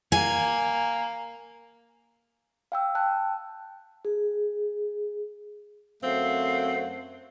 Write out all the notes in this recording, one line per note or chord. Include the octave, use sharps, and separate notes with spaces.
A#3 G#5
F5 G5 E6
G5 A5 F#6
G#4
F#2 A3 C4 F5 F#5